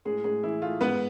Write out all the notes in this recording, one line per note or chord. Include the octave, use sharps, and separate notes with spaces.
A2 G#3 G#4
A2 G#3 G#4
E3 E4
A3 F4
G#2 B3 B4